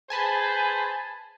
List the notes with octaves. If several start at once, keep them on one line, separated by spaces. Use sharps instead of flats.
G#4 B4 C5 G#5 A5 B5